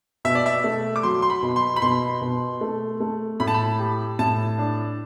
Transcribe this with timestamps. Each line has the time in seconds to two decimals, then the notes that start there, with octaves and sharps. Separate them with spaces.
0.25 B2 E5
0.35 D5
0.46 E5
0.64 A3
0.96 D6
1.03 F#3 C6
1.22 C6
1.30 B5
1.42 B2
1.56 C6
1.76 B5
1.82 B2 C6
2.21 B2
2.61 A3
3.00 A3
3.40 A2 B5
3.47 A5
3.54 B5
3.79 G4
4.19 A2 A5
4.58 D4